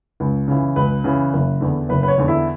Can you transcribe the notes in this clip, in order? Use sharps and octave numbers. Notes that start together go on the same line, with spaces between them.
C#2
C#3 E3
C#2 B4
C#3 E3
F#1
E2 D3
F#1 B4
B4
C#5
E2 D3
E4